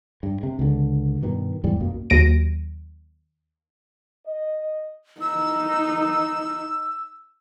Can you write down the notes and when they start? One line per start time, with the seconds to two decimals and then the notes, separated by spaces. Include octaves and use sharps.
0.23 G2
0.43 C3
0.59 C#2 D3
1.22 G2 B2 D#3
1.64 E2 G#2 G3
1.80 B1 F#2 B2 A#3
2.10 D#2 F#3 A#6 D7 D#7
4.26 D#5
5.21 D#4 E6